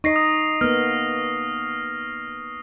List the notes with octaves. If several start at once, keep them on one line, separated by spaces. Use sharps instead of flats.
D#4 D#5 C#6 A#6 C7
D#6
A#3 B3 F6